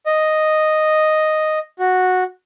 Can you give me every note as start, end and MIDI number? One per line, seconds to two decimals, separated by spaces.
0.06 1.59 75
1.79 2.24 66